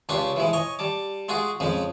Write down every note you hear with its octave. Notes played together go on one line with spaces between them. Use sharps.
C#2 C#3 D4 F4 G4 C#6
E3 F3 G#3
C#5 D#5 G#5
G3 A5 D6
G#3 F4 F#4 G#4
F2 C#3 F3 G#3